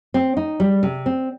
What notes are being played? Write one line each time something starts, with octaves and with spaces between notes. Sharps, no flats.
C4
D#4
G3
C3
C4